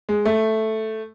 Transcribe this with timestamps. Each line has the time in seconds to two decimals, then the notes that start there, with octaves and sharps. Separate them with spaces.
0.09 G#3
0.25 A3